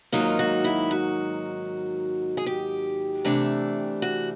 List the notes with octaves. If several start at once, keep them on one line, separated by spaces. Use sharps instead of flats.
G#2 D#3 F#3 A#3 D#4 F4
F#4
E4
F#4
G#4
G4
C3 E3 A3 D4
F#4